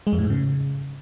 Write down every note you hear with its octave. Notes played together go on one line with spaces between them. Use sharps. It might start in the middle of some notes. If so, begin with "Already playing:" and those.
G#3
F2
A2
G#2
C#3